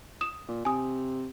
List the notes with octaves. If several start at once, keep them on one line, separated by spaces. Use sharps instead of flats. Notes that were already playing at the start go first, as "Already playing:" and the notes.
D#6 E7
A#2
C3 G#5 D#6